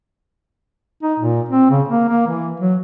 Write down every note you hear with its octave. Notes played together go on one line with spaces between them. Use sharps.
D#4
A#2
C4
C#3
A#3
A#3
E3
F#3